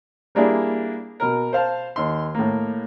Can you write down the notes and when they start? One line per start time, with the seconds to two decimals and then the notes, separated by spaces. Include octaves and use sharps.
0.35 G3 A#3 D4 E4 G#4
1.20 B2 A#4
1.53 C5 F5 A5
1.96 D#2 C6
2.35 A2 A#3